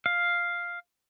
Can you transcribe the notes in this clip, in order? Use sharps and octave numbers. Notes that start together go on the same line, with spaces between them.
F5